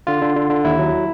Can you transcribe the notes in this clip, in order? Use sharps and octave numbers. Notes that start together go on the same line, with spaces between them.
D3 F4
D3
D3
D3
D#2 E4
F#3